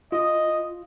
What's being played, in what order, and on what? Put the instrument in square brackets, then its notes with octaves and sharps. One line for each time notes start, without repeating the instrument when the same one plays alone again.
[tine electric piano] F4 [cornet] D#5